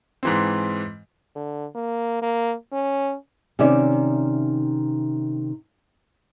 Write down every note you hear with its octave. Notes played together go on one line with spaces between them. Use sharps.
G#2 E3 C4
D3
A#3
A#3
C#4
C3 D#3 C#4 D5 E5